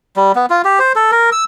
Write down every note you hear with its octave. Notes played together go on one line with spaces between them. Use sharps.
G3
B3
F4
G4
C5
A4
A#4
E6